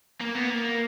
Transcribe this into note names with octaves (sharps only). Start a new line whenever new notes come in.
A#3
B3
A#3